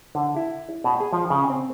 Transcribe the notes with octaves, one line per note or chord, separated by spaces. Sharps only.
D3
E4
B2
G#4
F3
C#3
C4